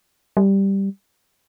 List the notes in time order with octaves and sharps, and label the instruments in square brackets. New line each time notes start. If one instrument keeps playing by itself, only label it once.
[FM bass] G3